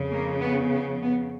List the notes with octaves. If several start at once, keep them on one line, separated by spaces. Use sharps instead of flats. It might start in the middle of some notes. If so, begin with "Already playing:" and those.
Already playing: F2 C#3
A#3
B3
B3
B3